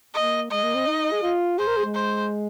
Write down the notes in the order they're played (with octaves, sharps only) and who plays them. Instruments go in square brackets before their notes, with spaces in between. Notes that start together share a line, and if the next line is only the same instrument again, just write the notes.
[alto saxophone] A#3 [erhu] D#5
[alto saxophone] G#3 [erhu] D#5
[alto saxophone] A#3
C4
D#4
G#4
F4
[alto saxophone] G#4 [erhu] C5
[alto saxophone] A#4
G#4
G#3
[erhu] C5